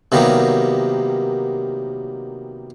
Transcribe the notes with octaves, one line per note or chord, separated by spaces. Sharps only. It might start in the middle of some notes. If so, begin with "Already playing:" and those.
C3 D#3 F#3 G3 A#3 B3